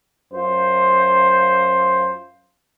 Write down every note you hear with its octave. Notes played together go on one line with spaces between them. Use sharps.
F#2 F4 C5